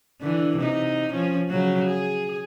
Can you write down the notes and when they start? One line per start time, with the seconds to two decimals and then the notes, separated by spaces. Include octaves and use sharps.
0.22 D3 E3
0.57 C3 D#4
1.12 F3 C#4
1.49 C#3 F#3 F#4
1.85 G#4